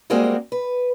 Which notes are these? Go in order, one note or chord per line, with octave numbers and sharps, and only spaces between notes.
G3 G#3 A#3 C4 F#4 G#4
B4